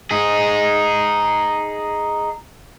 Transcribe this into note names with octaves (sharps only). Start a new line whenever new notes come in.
D#4 G#4